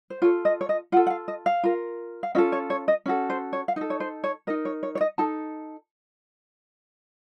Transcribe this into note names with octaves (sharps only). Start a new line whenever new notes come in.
C5
F4 A4 C#5
D#5
C#5
D#5
F4 A4 F#5
F#5
F5
D#5
F5
F4 A#4
F5
C#4 F4 A4 D#5
C#5
C#5
D#5
C#4 F#4 A4
C5
C#5
F5
D#4 A4 D#5
C#5
C5
C#5
D#4 A#4 D#5
C#5
C#5
C#5
D#5
D#4 A4 A5